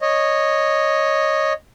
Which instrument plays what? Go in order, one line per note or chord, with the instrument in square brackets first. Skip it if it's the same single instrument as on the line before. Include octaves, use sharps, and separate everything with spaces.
[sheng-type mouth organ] C#5 D#5